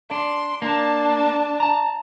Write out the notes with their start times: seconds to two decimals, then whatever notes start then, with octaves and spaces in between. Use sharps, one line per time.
0.11 D4 C6
0.62 A#3 D4 A5
1.60 A5 A#5